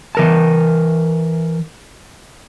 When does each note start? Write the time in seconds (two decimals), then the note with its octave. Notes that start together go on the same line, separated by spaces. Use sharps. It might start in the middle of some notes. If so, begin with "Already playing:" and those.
0.15 E3 A#4 A5